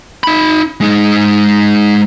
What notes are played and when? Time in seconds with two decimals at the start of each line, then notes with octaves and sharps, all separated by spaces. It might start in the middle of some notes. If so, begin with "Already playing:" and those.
0.24 D#4 B5
0.80 G#3 D#4